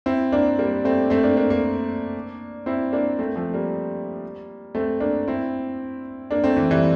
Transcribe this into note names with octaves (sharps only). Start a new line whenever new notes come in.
C4 E4
A#3 D4
G3 A#3
A3 C4
A3 C4
A#3 D4
A#3 D4
A#3 D4
C4 E4
A#3 D4
A3 C4
F3 A3
G3 A#3
A3 C4
A#3 D4
C4 E4
A#3 D4
A3 C4
E3
E3 G3